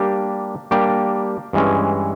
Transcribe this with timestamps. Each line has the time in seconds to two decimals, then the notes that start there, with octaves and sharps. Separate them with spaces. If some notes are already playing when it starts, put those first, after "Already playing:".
Already playing: G3 A#3 D4 G4
0.71 G3 A#3 D4 G4
1.53 G2 E3 G#3 C#4